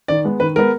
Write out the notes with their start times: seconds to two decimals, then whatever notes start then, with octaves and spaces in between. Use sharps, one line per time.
0.08 D#3 D5
0.24 G#3 B3
0.40 D#3 B4
0.56 G#3 B3 A#4